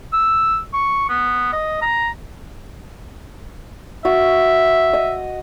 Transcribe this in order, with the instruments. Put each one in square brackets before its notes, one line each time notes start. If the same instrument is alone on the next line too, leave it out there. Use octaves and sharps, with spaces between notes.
[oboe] E6
C#6
B3
D#5
A#5
[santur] F#4 [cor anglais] E5
[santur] D#5